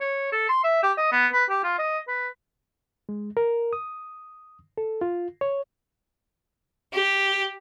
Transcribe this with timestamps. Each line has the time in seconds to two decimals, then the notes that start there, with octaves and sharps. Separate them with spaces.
0.01 C#5
0.32 A4
0.49 C6
0.64 E5
0.83 G4
0.98 D#5
1.12 B3
1.33 B4
1.49 G4
1.63 F4
1.79 D#5
2.08 B4
3.09 G#3
3.37 A#4
3.73 D#6
4.78 A4
5.01 F4
5.41 C#5
6.93 G4